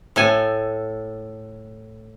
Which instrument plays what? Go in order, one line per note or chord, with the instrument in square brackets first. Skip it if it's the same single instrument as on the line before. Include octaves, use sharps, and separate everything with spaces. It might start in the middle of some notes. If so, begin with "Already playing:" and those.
[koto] A2 A4 G#5